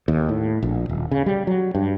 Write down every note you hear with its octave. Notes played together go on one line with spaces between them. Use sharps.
D#2
A2
A#1
D#1
C#3
G3
F#3
G2